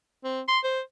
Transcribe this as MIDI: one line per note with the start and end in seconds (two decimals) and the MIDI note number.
0.24 0.41 60
0.48 0.59 84
0.64 0.81 72